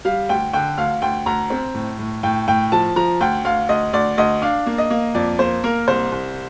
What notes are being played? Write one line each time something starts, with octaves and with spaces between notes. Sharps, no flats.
G3 F5
D2 G5
D3 G5
D2 F5
D2 G5
D2 A#5
C4
A2
A2
A2 G5
A2 G5
F3 A5
F3 A#5
D2 G5
D2 F5
D2 D#5
D2 D5
D2 D#5
D4 F5
A#3
D#5
A#3
F2 D5
A#3 C5
A#3 A#4
C2 C5
C2